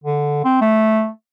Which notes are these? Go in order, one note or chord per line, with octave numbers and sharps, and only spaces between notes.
D3
C4
A3